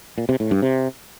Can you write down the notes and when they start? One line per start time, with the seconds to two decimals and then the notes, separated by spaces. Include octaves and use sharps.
0.18 A#2
0.29 C3
0.40 A2
0.51 G2
0.62 C3